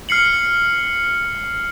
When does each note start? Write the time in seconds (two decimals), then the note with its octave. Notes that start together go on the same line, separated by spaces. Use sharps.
0.09 F6 C7 C#7 F#7